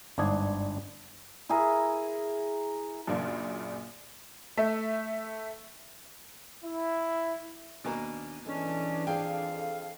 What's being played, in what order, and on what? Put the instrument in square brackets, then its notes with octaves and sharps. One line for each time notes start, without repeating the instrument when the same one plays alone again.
[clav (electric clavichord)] G1 G#2 D4 G#4 G#5
[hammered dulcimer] E4 G#4 A#4
[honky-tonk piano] F#2 A#2 C#3 A#3 D4
A3 E5
[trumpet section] E4
[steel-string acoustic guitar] D#2 D4 G#5 [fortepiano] B2 A#3
[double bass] E3 D4 [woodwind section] G#3 C#4 [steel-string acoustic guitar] A4
[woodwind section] F2 F5 [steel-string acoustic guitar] G#4 A4 [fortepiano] G5